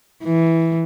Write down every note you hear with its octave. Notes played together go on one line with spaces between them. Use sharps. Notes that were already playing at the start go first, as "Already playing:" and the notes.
E3